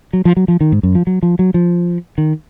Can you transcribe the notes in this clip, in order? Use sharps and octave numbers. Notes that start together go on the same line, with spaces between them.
F#3
F3
F#3
F3
D#3
G#2
F#2
F3
F#3
F3
F#3
F3
D#3